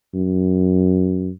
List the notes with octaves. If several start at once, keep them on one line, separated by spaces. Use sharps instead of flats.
F#2